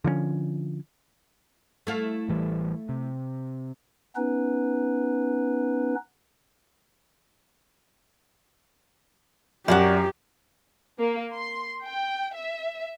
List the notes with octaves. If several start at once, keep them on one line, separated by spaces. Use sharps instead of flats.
D3 F3 A#3 C#4
A3 E4 F5
A1 E3 G3
C3
B3 C#4 D#4 B4
F#2 F#4 G4 A#4 D5
A#3
C6
G5
E5